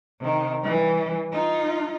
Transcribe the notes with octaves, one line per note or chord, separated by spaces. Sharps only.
C3 D#3
E3 G3
D#4 F4